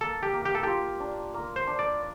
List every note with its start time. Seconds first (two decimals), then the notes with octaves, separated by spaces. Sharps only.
0.01 A#3 A4
0.23 G4
0.34 A#3
0.45 G4
0.55 A4
0.63 F4 G4
1.00 D4
1.34 A#3
1.56 C5
1.67 D4
1.79 D5